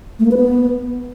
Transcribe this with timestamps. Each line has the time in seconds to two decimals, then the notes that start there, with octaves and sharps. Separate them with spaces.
0.19 A3
0.25 A#3
0.31 B4
0.37 B3